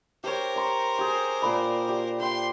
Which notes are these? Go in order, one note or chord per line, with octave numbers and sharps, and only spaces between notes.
G4 A#4 C5 C#5
A#5 C6 C#6
G4 G#4
A#2 D5 B5
G4
C5 G5 C6